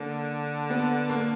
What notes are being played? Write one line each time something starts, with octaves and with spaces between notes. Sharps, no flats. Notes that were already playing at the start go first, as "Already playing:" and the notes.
Already playing: D3 A#3
B3
A#3